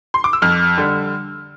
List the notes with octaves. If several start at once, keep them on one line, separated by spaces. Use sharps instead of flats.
C6
D6
E6
F2 F6
D3 G3